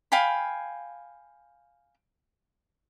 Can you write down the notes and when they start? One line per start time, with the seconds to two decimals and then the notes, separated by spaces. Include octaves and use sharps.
0.12 F5 G5 G#5 B5